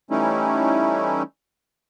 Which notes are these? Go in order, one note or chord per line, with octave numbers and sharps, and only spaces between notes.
E3 G3 A3 C#4 D#4 E4